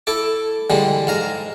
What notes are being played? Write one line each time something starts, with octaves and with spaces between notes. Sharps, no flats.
E4 A4 D6
D3 E3 G3 G#3
G#2 F5 A#5